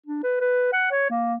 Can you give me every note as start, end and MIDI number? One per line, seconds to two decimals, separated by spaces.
0.06 0.22 62
0.23 0.40 71
0.41 0.71 71
0.73 0.90 78
0.92 1.09 73
1.10 1.35 58